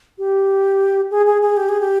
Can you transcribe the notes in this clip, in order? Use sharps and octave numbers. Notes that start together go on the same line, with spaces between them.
G4
G#4
G#4
G#4
G4
G#4
G4